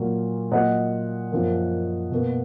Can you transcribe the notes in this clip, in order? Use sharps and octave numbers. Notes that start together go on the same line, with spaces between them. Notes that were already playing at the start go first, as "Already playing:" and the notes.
Already playing: A#2 F#3 A#3
A#2 F#3 A#3 D#5 F#5
F#2 F3 A#3
B2 A#3